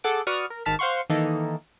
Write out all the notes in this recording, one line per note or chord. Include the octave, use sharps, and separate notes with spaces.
G#4 A4 F#5 D6
F#4 B4 D5 C#6 D#6 F6
A#4
G#1 D#3 A5 F6 B6
C5 F5 F#5 C6 C#6
D#3 E3 A#3 D#4 A4 D#5